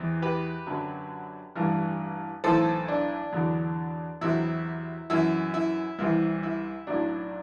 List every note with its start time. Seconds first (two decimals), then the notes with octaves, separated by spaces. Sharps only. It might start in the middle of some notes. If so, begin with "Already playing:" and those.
Already playing: E2 C3 E3
0.22 G4 B4
0.67 F#2 D3 F#3
1.56 A1 G2 E3
2.44 B1 A2 E3 A4 C5
2.88 D4
3.33 E2 D3 F#3
4.21 E2 C3 F#3 E4
5.10 F#2 E3 E4
5.54 E4
5.99 C2 C3 E3 E4
6.43 E4
6.87 B1 A2 F#3 D4